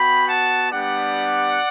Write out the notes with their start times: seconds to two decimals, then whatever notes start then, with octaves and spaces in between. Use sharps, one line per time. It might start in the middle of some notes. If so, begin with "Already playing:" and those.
Already playing: B3 F#4 G5 B5
0.27 F#5 A5
0.72 G3 B3 D4 G4 D5 F#5